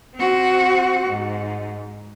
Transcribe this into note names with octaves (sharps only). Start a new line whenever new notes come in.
C4 F#4
G#2